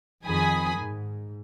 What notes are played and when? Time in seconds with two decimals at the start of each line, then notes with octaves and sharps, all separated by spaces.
0.25 F2 D#3 G#4 G#5 B5 D#6
0.78 G#2